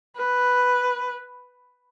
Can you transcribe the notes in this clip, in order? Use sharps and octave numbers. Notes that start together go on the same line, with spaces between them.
B4